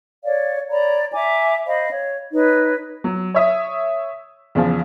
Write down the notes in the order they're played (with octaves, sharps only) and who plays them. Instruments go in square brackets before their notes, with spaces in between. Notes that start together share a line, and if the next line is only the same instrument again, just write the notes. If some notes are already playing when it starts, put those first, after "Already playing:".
[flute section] C#5 D5 F5
C#5 D5 A#5 B5
E5 G#5 A#5 D6
C5 D#5 F5 B5
C#5
D#4 B4 C#5
[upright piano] F#3
C#5 E5 D#6
E2 C#3 F3